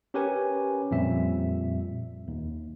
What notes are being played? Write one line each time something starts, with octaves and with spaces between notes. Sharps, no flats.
C#4 G4 A#4 B4 C#5 G#5
F2 A#2 G3 E5
D#2